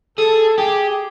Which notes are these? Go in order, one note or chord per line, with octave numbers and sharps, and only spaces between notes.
G#4 A4
G4 G#4